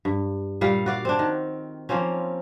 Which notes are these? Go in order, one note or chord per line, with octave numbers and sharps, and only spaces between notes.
G2
A#2 G3 F5
F#4 D5 F5
C4 D4
D#3
F3 A#3 C4 C#4